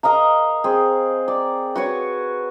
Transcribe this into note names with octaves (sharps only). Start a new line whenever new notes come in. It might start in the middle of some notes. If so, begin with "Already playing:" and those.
A#4 D#5 F5 A#5
C4 G#4
D5
F#4 B4 C#5 F#5